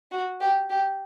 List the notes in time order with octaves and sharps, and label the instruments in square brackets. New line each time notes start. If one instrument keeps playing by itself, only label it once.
[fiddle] F#4
G4
G4